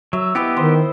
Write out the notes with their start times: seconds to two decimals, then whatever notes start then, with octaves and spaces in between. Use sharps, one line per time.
0.13 F#3 E5
0.35 B3 E4 G4 D#5 D6
0.57 D#3 C5